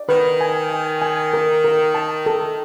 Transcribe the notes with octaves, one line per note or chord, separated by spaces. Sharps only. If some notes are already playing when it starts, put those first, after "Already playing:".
Already playing: D5
D#3 B4
G#5
G#5
G#5
A#4
A#4
A5
A4